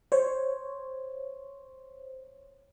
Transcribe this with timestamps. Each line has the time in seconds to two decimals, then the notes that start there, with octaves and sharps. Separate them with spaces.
0.12 C5 C#5